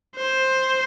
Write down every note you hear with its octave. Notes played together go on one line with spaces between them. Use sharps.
C5